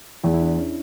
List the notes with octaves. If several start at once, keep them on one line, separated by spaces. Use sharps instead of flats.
E2 E4
E4
D4
C#4